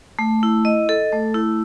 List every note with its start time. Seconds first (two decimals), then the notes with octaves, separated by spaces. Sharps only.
0.19 A3
0.43 E4
0.65 D#5
0.89 A4
1.12 A3
1.34 E4